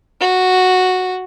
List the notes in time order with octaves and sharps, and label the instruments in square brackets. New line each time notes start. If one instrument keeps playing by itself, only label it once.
[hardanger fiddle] F#4